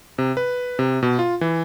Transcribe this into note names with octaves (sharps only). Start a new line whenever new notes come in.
C3
B4
C3
B2
F4
E3